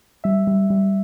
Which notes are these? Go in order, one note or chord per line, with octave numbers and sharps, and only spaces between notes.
G3 E5
G3
G3